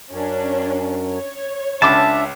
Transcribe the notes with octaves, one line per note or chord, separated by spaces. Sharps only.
F#2 C#4 D4
C#5
C#2 D4 E5 A5 B5 D6